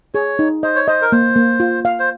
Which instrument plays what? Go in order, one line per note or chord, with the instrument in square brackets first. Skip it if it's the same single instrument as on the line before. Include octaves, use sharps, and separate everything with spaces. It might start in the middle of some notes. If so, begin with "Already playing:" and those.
[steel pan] G#4 [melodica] C#5
[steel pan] D#4
[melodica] C5 [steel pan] D#5
[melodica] C#5
[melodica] C5 [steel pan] D#5
[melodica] A#4
[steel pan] A#3 [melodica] C5
[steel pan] A#3
F4
F5
[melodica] C5